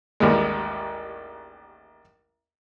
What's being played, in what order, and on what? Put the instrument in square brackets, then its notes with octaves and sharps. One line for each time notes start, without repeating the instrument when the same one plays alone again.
[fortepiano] A1 D#2 G3 G#3